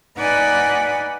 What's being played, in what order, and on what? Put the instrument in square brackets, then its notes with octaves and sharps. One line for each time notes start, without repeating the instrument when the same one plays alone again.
[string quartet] D#4 B4 D5 F#5 G#5 B5